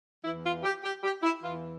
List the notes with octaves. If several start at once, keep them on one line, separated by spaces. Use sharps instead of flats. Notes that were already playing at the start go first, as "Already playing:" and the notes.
E2 E3 E4
F4
G4
G4
G4
E4
E2 E3 F4